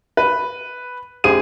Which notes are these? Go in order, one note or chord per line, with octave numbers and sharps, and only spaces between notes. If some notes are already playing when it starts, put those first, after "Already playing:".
B4
A1 G4 G#4 C5 D#7